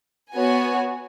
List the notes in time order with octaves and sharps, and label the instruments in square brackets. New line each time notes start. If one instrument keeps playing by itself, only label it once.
[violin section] B3 F#4 C#5 G#5